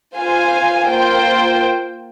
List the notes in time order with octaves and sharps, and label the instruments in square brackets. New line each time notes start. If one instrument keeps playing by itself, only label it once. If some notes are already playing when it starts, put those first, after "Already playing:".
[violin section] F4 C5 F5 G#5
A#3 F4 C5 G5